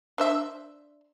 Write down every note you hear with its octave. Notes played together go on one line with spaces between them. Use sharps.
D4 C5 E5